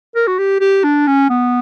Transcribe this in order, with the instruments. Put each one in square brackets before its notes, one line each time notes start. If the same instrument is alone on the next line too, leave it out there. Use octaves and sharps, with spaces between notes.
[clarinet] A#4
F#4
G4
G4
D4
C#4
B3